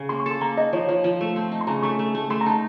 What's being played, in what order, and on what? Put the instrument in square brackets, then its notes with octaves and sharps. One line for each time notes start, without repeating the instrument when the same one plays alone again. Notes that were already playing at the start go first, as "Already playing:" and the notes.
Already playing: [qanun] C#3
[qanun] A#3 [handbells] C6
[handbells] C#6
[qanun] A4
[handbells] C6
[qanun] A#3 [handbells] A#5
[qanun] D#4 [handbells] D#5
[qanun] F3 [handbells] C#5
[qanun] F3 [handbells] C#5
[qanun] F3
A3
C4
D#4
[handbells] C6
[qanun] C#3 [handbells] A#5
[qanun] A3 [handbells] C#6
[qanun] A3
A3
[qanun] A3 [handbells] C6
[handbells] A#5
[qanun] D#4 [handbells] A5
[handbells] A#5